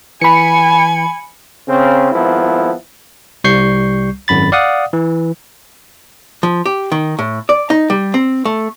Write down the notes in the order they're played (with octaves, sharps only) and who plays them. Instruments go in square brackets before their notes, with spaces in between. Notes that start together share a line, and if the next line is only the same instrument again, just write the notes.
[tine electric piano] E3 [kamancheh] G#5 [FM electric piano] B5 C#7
[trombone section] C#3 C4
G#1 F3 B3 E4
[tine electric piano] C2 G3 C#6 G6 C7
G#1 F#2 B5 A6
D5 F5 F#5 D#6
E3
[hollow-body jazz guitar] F3
G4
D#3
A2
D5
D#4
G3
C4
A3